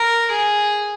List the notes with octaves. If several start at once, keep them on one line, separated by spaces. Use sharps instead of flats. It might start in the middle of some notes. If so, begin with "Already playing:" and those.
Already playing: A#4
G#4